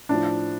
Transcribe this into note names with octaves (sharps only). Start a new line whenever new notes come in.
A2 F3 D4